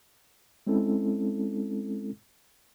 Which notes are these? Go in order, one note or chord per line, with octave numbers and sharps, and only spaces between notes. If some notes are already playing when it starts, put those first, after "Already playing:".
G#3 C4 C#4 E4 A4